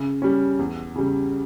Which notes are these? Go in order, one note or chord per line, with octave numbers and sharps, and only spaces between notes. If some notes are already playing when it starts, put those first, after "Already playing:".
Already playing: C#3
G3 C#4
E2
C#3 G3